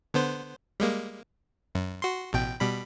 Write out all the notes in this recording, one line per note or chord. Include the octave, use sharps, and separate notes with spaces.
D3 B3 C5
G3 G#3 A#3
F#2
F#4 C6
A1 B2 G5
B2 G3 B5